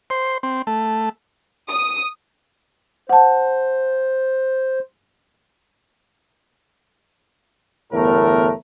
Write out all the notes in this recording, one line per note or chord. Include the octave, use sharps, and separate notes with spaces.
C5
C4
A3
D#6
C5 F#5 A5
G1 E2 A2 A3 A#4